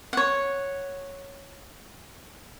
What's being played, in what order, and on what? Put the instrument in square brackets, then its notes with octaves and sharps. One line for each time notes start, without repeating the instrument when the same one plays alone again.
[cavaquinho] C#5 F#5